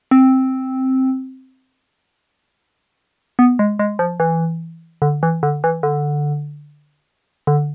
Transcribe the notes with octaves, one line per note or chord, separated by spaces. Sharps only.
C4
B3
G#3
G#3
F3
E3
D3
E3
D3
E3
D3
D3